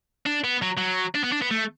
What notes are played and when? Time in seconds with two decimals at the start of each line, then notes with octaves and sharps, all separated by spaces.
0.26 D4
0.44 B3
0.62 F#3
0.77 F#3
1.15 D4
1.24 B3
1.32 D4
1.42 B3
1.51 A3